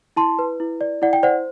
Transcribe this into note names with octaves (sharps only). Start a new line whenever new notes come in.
E4 A5 C6
B4
E4
D5
E4 D5 F#5
G5
C5 D5 F#5